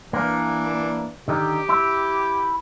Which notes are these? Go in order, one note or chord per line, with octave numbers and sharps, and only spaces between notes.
E3 A#3 D4
D3 D#3 D#4 G4
E4